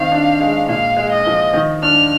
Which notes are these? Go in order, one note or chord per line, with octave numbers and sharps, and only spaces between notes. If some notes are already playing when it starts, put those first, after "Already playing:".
Already playing: D#3 C4 F5
D4
G#3
A#2 F5
G#3
D#5
F3
D#3
D4 F6